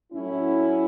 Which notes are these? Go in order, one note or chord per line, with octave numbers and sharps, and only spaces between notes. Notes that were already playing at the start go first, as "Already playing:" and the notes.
A2 F#3 C#4 E4